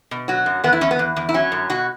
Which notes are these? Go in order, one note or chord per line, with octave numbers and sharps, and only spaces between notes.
B2
F#3 F#4
F#2
E2 B3
E4
E2 C#4
B3
E2
E2
E4
F#3 C#4
F#2
B2 F#4